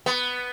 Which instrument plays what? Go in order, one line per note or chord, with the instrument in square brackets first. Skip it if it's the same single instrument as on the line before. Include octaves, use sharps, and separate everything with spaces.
[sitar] B3